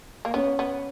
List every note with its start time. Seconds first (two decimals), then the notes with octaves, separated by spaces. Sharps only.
0.25 A#3
0.34 B3 C#4
0.59 B3